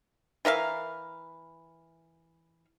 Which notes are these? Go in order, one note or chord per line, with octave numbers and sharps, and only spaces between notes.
E3 A#4 E5 F5